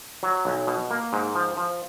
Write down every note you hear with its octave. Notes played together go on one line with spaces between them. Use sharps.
F#3
B1
B2
A#3
G#2
F3
F3